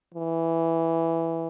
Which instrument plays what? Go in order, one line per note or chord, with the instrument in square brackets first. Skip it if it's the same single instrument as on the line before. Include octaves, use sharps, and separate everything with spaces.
[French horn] E3